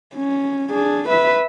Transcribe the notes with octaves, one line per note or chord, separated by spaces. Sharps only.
C#4
D4 G#4
B4 E5